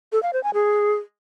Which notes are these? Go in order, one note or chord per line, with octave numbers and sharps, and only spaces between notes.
A4
F5
C5
G#5
G#4